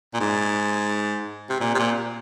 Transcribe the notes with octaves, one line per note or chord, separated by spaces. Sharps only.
A#2
G#2
C3
A#2
C3
A#2